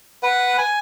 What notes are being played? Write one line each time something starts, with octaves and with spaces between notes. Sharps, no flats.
B4 F#5
G#5